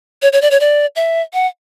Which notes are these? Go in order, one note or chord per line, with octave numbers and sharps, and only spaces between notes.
C#5
C#5
D5
C#5
D5
E5
F#5